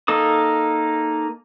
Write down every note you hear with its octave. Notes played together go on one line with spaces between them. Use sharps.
A#3 D#4 A4 D#6